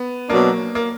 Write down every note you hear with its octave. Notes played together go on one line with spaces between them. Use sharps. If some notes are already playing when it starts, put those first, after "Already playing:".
Already playing: B3
B2 F#3 A#3 D4
A#3